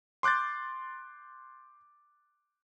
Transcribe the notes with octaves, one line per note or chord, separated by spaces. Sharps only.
C6 D6 F#6 G6 A6